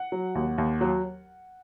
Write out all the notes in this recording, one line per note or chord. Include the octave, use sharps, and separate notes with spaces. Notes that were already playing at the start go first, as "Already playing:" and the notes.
Already playing: F#5
F#3
D#2
D#2
F#3